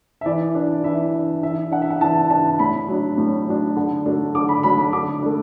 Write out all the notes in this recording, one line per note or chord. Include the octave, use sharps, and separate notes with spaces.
E5
E3 D5
D4
E3 E5
D4
E3 E5
D4 F#5
E5
F#5
E3 A5
D4 A5
A2 B5
F#3 D4
A2
F#3 D4
D3
F#3 A3 D4
D3 D6
B5
F#3 A3 D4 B5
B5
D3 D6
A3 D4